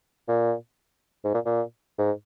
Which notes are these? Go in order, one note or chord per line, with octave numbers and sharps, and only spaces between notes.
A#2
G#2
A#2
A#2
G#2